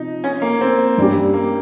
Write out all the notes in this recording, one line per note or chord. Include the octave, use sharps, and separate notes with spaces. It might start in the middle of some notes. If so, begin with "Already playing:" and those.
Already playing: C3 F3 D#4
C#4
A#3
C4
G2 G3 C#4 G4
A#3